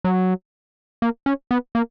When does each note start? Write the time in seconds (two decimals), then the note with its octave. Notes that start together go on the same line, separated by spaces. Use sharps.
0.04 F#3
1.02 A#3
1.26 C#4
1.51 B3
1.75 A#3